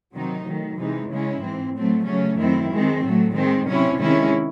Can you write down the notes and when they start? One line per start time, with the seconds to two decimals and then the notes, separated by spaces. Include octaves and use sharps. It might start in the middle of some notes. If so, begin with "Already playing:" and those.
0.13 C3 D#3 F#3 C4 D#4
0.45 D#3 F#3 A3
0.78 C3 E3 G#3 D#4
1.10 C#3 G#3 C#4 E4
1.42 G#2 E3 C4
1.74 A2 F#3 A3 C4
2.06 C#3 F#3 A3 C#4
2.39 F#2 D#3 A3 C4 E4
2.71 D#3 G#3 C4
3.03 A2 F#3 A3
3.35 D#3 G#3 C4
3.68 C3 F#3 C#4 E4
4.00 C3 D#3 G#3 C#4 E4